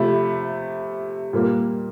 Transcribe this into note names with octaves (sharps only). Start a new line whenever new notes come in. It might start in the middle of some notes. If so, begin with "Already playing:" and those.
Already playing: C3 F3 A3 B5
A#2 G3 A#3